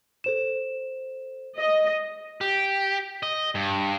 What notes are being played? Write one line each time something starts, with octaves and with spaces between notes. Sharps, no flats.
A4 C5 E7
D#5
G4
D#5
G2